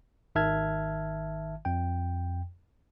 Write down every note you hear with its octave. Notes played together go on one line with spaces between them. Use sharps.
G#1 D#3 E5 A5 F6 G#6
F2 G5